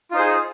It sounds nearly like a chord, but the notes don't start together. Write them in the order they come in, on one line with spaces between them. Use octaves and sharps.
F4 D#4 C5 G#4